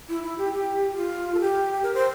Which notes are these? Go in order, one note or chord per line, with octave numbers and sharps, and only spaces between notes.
E4
E4
G4
G4
G4
F4
A4
G4
A#4
C5